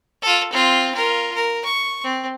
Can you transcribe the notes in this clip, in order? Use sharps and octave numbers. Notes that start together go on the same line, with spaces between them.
F4 A4
C4 F4
F4 A#4
A#4
C#6
C4